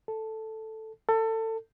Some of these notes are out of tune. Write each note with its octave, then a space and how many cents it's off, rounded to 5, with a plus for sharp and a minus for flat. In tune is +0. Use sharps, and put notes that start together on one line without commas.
A4 +0
A4 +25